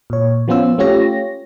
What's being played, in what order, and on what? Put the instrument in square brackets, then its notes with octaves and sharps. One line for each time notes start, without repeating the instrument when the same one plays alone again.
[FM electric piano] A#2 C#5
F3 B3 C#4 F4 C5 E6
A3 C#4 F4 G4 C#5 A#6